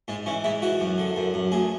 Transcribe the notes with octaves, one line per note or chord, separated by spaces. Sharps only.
G#2 G#3
E3 C#4
G#2 E4
E3 F#4
F#2
D3
F#2
F#2
D2 G#4